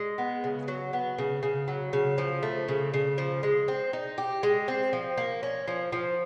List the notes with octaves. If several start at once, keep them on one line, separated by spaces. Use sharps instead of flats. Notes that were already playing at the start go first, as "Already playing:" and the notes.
Already playing: G#3
B3
C#3
F#3
B3
C#3
C#3
F#3
C#3
F3
A3
C#3
C#3
F3
G#3
C4
D#4
G4
G#3
C4
F3
A#3
C#4
F3
F3